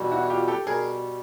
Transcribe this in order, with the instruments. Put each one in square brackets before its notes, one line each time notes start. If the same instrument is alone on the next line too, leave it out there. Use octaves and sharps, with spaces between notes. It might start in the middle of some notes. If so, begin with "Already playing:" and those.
Already playing: [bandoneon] E2 B2 G3
[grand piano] E4 F#4
F4 G4
G4 A4
[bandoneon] B2 G3 [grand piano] G#4 A#4